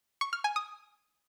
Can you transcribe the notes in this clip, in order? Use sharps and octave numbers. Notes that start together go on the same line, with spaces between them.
C#6
F6
G#5
D#6